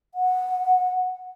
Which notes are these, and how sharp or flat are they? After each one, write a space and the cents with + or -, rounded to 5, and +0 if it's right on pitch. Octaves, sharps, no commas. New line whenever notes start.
F#5 -10